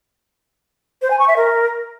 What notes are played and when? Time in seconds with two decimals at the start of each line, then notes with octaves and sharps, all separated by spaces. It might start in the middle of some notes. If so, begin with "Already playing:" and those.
1.02 C5
1.11 G#5
1.19 C#6
1.28 E5
1.37 A#4